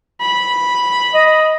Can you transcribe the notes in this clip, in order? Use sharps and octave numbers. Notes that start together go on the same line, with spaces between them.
B5
D#5